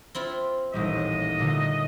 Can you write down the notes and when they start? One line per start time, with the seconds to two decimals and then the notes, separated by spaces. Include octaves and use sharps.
0.15 C4 E4 F4
0.73 D#1 A1 G3 D#5
1.39 A#2 D3 A3